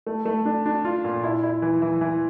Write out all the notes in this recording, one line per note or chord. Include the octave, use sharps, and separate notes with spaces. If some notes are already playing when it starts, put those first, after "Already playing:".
A3
A3
D4
D4
F4
A#2
E4
E4
E3
E3
E3